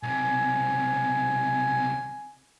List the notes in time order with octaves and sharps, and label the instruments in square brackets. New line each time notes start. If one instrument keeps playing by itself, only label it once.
[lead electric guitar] B1 C3 [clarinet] G#5